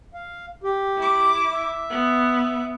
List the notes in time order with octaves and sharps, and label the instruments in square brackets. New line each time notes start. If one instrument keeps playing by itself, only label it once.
[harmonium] F5
G4
[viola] E4 D6
[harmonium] E5
[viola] B3